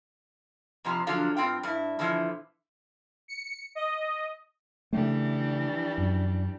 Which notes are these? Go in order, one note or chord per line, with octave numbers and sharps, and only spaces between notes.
F2 C3 F3
D3 F3 F#3 F4
G2 C4 F4 G5
G2 E4
B2 D3 E3 F3 E4
C#7
D#5
C#3 E3 G3 A3 D4
F#2